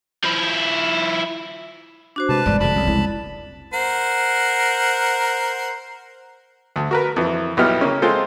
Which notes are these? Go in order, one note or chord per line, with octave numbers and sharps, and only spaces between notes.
F3 E4
D4 F#4 C5
C3 G#3 B4 A5
E1 G2 G#3 D5
F1 B2 D3 A5 B5
C2 F2 C#3
G#3 E4
A#4 C5 F#5
D2
F#4 A#4 B4
F2 E3
B1 F#3 G3 B3 E4 F6
C#3 A#3 C#4
G#3 C4 F4 A4 C5